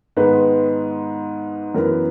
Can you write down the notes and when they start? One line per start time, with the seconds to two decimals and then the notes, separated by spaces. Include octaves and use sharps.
0.17 G#2 D#3 G#3 B3 B4
1.75 F#2 E3 B3 A#4